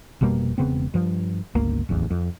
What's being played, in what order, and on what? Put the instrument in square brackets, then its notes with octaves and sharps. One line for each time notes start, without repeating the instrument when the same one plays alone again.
[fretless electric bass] F1 B2 G3 A#3
E1 C#3 B3 C4
G2 F3
G1 C#2 A#3
D1 A1 E2
F2